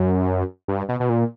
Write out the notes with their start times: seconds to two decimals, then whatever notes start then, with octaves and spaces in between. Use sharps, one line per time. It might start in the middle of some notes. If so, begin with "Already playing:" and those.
Already playing: F#2
0.68 G2
0.89 B2
1.00 B2
1.09 A#2